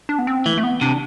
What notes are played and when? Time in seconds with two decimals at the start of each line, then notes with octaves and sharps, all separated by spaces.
0.09 D4
0.19 B3
0.27 C4
0.46 E3 A3
0.58 A3
0.63 B3
0.81 C3 D4